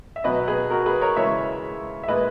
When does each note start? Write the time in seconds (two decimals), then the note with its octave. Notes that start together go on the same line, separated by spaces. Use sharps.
0.16 E5
0.24 B2 F#3 B4 D#5
0.48 G#4 B4
0.70 F#4 A#4
0.86 G#4 B4
1.01 A#4 C#5
1.16 C#3 E3 G#3 C#5 E5
2.03 E5
2.08 A#2 G#3 B4 D#5